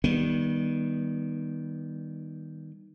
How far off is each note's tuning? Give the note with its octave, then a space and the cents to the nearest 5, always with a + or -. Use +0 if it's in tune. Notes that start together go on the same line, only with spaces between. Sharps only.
D#3 +0 G3 +0 B3 -30